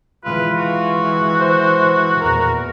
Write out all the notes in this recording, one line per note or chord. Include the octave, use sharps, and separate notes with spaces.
E3 G#3 F4 B4
F#4
C5
E2 A#2 A#4